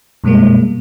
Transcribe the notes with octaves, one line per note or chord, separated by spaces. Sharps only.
F#2 B2 G3 G#3 A#3